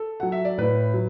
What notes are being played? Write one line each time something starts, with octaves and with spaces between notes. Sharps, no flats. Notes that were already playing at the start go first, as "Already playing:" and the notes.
Already playing: A4
F#3 F#5
E5
D5
A2 B4
F#3